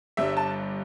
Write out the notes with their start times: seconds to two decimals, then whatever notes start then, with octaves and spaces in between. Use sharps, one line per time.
0.17 G1 G2 G3 E5
0.37 A5